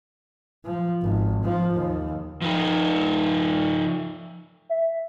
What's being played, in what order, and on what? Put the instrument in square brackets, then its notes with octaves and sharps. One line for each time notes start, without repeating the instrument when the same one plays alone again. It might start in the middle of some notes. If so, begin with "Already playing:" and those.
[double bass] F3
G#1
F3
D#2
[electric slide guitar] F3 D#4
[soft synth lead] E5